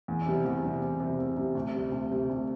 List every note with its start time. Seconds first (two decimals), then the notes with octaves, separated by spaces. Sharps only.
0.08 E2
0.26 C3 G3
0.45 E2
0.63 C3 G3
0.81 E2
1.00 C3 G3
1.18 E2
1.37 C3 G3
1.55 D2
1.73 C3 G3
1.92 D2
2.11 C3 G3
2.29 D2